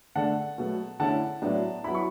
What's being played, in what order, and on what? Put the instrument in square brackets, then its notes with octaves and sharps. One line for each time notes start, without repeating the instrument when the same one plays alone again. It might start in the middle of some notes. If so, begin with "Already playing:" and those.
[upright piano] D3 A3 D4 F#5 A5
B2 F#3 A3
D3 A3 C#4 E4 F#5 A5
A2 F#3 B3 D4
F#3 B3 E4 B5
C#6